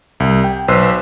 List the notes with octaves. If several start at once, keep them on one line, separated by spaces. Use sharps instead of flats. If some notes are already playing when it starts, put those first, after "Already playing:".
C2
G5
B1 B4 C5 C6 E6 F#6